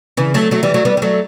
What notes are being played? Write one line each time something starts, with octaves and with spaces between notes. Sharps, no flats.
C#3 E3
F#3 A3
F#3 A3
E3 G3
F#3 A3
G3 B3
G3
F#3 A3